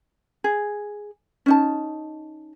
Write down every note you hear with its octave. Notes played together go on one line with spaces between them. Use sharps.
G#4
C#4 D#4 A5